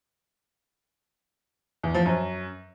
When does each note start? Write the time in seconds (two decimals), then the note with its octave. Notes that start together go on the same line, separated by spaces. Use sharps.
1.83 E2
1.95 F3
2.06 F#2